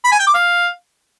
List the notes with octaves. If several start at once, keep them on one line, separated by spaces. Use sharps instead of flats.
B5
G#5
G5
D6
F5